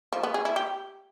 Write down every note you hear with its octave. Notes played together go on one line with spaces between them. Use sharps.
F3
B3
G#4
E4
G4